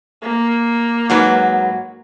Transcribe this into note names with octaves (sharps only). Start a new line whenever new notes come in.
A#3
G#2 F#3 B4